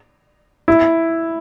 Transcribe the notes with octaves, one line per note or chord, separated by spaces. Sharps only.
E4